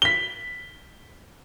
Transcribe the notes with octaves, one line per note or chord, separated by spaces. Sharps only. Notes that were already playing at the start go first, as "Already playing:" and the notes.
B6 G7